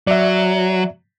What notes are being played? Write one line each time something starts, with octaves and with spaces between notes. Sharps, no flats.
F#3 D5 E5